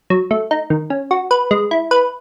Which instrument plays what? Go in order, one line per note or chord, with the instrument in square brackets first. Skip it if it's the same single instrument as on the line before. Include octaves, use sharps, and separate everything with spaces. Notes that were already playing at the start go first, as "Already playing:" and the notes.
[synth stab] F#3
A3
D#4
D#3
C#4
F#4
B4
G#3
E4
B4